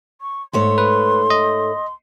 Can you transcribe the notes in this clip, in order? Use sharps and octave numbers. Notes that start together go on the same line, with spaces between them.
C#6
G#2 A3 C#5 C6
B4
D#5